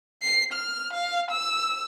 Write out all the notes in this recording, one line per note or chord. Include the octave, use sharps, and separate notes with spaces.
C7
F6
F5
E6